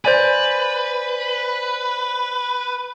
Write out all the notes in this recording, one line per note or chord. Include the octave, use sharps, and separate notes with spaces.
B4 C5 D5 G#5